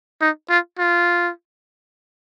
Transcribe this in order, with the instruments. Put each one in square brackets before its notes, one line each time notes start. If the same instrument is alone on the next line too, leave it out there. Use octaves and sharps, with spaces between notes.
[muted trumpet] D#4
F4
F4